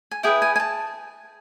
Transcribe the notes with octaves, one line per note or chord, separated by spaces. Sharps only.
G#5
E4 G#4 B4 G5
G#5
G#5
A5